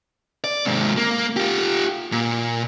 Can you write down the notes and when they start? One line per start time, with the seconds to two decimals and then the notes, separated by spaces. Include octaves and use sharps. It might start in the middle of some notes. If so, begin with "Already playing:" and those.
0.44 D5
0.65 G#2 C3
0.97 A#3
1.36 F4 G4
2.12 A#2